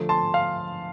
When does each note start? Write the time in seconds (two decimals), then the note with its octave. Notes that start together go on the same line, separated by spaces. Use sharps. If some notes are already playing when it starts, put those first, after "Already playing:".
Already playing: D3 F3 A3
0.09 A5 C6
0.34 F5